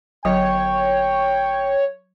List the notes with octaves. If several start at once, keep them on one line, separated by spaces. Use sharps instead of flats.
G1 F#3 C#5 G5